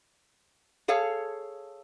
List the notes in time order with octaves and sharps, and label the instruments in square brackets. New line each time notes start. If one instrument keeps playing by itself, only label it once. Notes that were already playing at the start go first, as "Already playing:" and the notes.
[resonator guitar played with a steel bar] G#4 A4 C#5 F5 A5